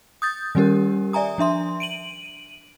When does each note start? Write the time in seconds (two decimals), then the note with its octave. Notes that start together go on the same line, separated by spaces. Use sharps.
0.22 D#6 G6 A6
0.55 D#3 G3 C#4 G4 A#4
1.13 D5 E5 G#5 A#5 D#6
1.38 F3 D4 E5 C6
1.80 D7 D#7 F#7